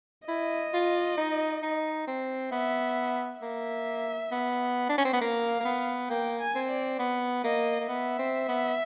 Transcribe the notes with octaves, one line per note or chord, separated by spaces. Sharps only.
E4 D#5
F4
D#4
D#4
C4
B3 E5
A#3 E5
B3
D4
C#4
C4
B3
A#3 F5
A#3
B3
A#3 G5
G#5
C4
D5
B3
A#3 D#5
A#3
B3 E5
C4
B3